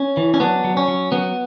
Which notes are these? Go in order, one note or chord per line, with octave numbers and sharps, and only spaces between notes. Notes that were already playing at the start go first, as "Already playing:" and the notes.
Already playing: C#4
E3
C#4
F#3 B3 D4
F#3
C#4
F#3
F#3 B3